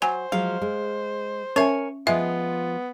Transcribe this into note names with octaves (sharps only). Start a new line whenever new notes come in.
F#3 C5 G#5
F3 F#3 G#3 F5
G#3
C#4 A#4 C#5 E5 G#5
F3 G#3 B3 F4 E5